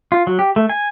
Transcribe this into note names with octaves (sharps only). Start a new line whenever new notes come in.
F4
F#3
G4
A3
G#5